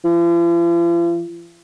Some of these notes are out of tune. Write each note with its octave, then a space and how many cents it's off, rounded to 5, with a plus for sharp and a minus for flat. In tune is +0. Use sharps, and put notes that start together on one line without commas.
F3 -45